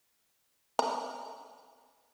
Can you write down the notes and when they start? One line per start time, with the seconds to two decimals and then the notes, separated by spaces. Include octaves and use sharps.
0.79 A#5